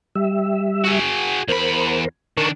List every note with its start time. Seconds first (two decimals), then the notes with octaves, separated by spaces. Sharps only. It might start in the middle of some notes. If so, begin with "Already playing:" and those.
0.15 G3 E5
0.85 F#4 G#4
1.48 E2 A#4 C5 B5
2.37 D#3 D4 A#4 A5 C#6